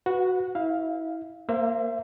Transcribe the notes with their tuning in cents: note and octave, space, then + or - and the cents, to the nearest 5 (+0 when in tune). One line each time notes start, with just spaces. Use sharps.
F#4 +0 B4 +0 F#5 -30
E4 -30 F5 +0
A#3 -10 C5 +0 E5 +30